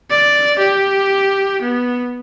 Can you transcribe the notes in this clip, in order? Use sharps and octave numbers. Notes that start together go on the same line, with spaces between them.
D5
G4
B3